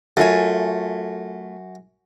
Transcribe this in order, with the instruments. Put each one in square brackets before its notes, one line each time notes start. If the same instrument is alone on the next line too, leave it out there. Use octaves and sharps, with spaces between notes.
[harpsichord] F#2 [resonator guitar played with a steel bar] A3 F4 G#5